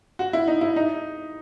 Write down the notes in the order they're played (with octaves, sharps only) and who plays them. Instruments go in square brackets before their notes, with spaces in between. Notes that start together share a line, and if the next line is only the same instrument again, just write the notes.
[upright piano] F#4
E4
D#4
E4
D#4